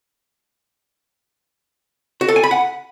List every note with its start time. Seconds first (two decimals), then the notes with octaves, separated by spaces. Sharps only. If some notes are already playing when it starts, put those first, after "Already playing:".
2.21 F#4
2.28 A4
2.36 G#5
2.43 B5
2.51 F#5